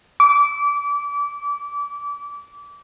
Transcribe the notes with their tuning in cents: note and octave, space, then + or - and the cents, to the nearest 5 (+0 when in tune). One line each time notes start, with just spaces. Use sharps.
D6 -25